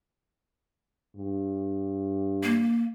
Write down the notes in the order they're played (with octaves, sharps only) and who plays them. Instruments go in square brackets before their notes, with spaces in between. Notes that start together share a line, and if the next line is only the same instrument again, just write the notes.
[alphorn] G2
[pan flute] A#3